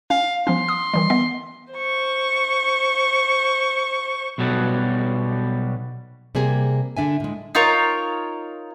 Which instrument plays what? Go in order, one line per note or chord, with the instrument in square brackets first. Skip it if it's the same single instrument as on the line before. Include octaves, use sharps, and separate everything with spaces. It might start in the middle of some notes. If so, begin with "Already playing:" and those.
[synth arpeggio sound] C#4 [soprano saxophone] F5
[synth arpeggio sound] F3 B3 C#4 [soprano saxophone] C6
[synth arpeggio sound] D#6
D#3 E3 G3
B3 D#5
[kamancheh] C5 C#6
[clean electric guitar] B1 B2 F#3 G3
[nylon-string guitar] C3 G3 A#3 G#4
D3 D4 E5 G#5
A2 G#3
[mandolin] D#4 F4 A#4 C#5